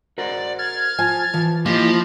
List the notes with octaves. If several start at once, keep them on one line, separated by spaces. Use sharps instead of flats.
F#4 A#4 C5 D5
F6 G#6 A6
F3 G#5
E3 F3
E3 F3 A#3 E4 G4 C5 D#5